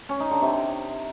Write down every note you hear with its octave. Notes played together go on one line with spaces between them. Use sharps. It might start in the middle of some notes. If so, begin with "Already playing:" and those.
C#4
D#4
D3
C3